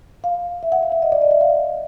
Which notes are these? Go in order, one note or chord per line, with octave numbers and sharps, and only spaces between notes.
F5
E5
F#5
F5
E5
D#5
D5
D#5
E5
F5